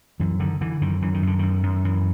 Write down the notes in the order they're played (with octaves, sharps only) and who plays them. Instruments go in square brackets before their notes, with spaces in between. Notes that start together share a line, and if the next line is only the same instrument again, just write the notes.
[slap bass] F#2 E3
D3 D#3
D3 E3
F#2 D#3
F#2 E3
D#3
F#2 D3
F#2 D#3
F#2
F#2 E3